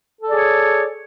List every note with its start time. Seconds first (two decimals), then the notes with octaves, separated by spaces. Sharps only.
0.22 A4
0.26 D5
0.30 G#4
0.35 C#5